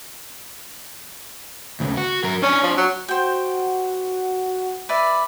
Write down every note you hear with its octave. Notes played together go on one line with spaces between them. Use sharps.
D2 C#3
F#4
F#3 A#4
C#4 D4 C#5
F3
F#3
F#4 C5 G5
B4 D5 E5 B5